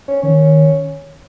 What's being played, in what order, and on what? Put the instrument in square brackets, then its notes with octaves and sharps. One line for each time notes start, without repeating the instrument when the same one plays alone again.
[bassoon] C#4
[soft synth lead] D#3 [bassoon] C#4